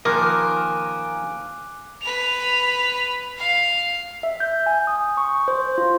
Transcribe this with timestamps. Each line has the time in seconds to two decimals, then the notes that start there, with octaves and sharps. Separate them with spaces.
0.05 D#3 F3 A#3 A#4 F5 G#5 D6 F#6
2.02 B4 F7
3.38 F5
4.23 E5
4.40 G6
4.66 G#5
4.87 D#6
5.17 C#6
5.48 C5
5.78 F4